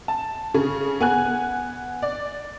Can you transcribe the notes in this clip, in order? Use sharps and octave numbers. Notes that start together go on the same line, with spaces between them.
A5
C#3 G#4
B3 G#5 F#6
D5